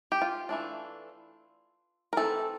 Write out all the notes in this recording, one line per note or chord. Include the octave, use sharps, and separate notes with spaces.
G4
F4
E3 A3 D4
A#4
E3 A3 C4 A4